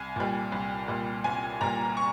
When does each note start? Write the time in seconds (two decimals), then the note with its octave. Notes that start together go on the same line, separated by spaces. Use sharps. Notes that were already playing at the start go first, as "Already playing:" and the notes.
Already playing: C2 G#5
0.16 A#2 G3
0.52 C2
0.88 A#2 G3
1.24 C2 G#5
1.61 A#2 G3 A#5
1.97 C#6